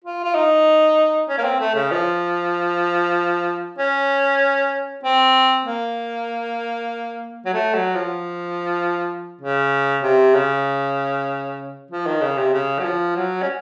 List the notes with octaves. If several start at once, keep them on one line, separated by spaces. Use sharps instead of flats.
F4
F4
D#4
C#4
A#3
C4
A3
C#3
F3
C#4
C4
A#3
F#3
A3
F#3
F3
C#3
C3
C#3
F3
D#3
C#3
C3
C#3
F#3
F3
F#3
C#4